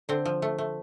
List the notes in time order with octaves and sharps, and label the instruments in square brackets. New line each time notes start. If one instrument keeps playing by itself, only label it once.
[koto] D3 C4
F3
A3
A3